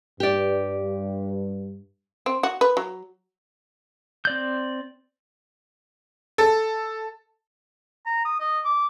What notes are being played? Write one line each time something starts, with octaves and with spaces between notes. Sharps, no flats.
G2 G4 D5
C4
F#4
B4
F#3
C4 D5 G6
A4
A#5
D#6
D#5
D6